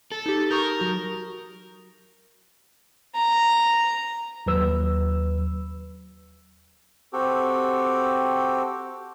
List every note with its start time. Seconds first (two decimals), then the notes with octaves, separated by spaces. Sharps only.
0.12 A4
0.26 D#4 G4
0.51 A#4 C#6 D#6 G6
0.80 F#3 F#4
3.15 A#5
4.46 D#2 F#3 B4 E6
7.13 C4 F#4 G4 A4